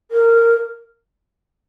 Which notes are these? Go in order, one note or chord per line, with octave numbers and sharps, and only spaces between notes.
A#4